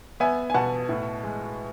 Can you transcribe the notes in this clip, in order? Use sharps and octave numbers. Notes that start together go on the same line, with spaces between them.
B3 E5 G#5
G#5
B2 F#5 A5
A2
G#3